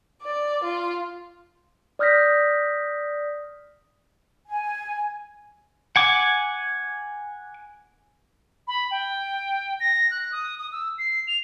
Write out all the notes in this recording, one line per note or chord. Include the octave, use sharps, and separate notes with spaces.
D5
F4
D5 D#6 F6 G6 A#6 B6
G#5
F#5 G#5 D6
B5
G5
A#6
F#6
D#6
D#6
E6
C7
F7